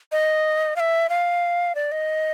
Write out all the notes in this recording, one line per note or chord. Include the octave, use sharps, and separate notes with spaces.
D#5
F5
E5
F5
D5
D#5